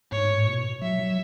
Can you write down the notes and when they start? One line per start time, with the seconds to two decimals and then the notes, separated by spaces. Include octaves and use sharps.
0.12 G#2 C#5
0.30 A2
0.47 B2
0.82 F#3 E5
0.99 F#3